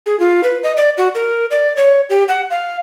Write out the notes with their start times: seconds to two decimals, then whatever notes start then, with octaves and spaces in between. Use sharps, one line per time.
0.06 G#4
0.20 F4
0.43 B4
0.63 D#5
0.77 D5
0.98 F#4
1.15 A#4
1.51 D5
1.77 C#5
2.10 G4
2.28 F#5
2.50 F5